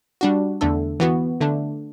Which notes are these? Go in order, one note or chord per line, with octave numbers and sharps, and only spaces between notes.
G3 D4 F#4
E2 D3 A3 D4 A4
E3 B3 F#4
D3 A3 D4